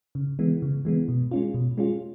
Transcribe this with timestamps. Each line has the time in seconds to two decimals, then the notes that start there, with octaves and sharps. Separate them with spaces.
0.15 C#3
0.39 E3 G#3 B3
0.62 C#3
0.85 E3 G#3 B3
1.08 B2
1.31 G#3 C#4 F4
1.54 B2
1.78 G#3 C#4 F4